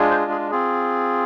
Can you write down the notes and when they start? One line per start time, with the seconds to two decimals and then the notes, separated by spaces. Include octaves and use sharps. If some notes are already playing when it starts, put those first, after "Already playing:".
Already playing: G#3 D4 F4 G#4
0.10 C5
0.31 G#4
0.51 C4 F4 G#4